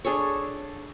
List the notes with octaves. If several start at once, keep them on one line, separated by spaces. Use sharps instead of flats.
D4 G#4 A4 C#5